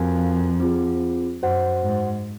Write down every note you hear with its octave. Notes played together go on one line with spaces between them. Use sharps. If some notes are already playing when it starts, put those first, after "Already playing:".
Already playing: F2 F#4 A#4 F5 G#5
C4 F4 G#4
F#2 F#4 C5 F#5
G#2